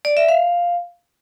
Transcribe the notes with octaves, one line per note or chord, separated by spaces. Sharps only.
D5
E5
F5